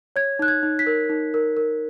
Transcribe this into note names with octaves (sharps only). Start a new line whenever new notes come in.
C#5 G#6
D#4 F#6
G#6
D#4
B6
A#4
D#4
A#4
A#4